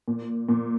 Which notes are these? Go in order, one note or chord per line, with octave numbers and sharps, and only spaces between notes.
A#2
A#2